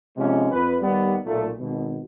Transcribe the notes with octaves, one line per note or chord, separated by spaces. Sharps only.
G#2 C3 F3 G#3 B3 C#4
F2 B4
D#2 G3 B3
B1 A#2 A3
G#1 B2